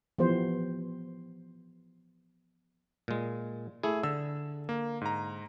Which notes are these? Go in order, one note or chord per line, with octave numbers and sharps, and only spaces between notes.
E3 F3 B3 G4 C5
A#2 G#3
A3 E4 G#4
D3 E6
A#3
G#2 A#5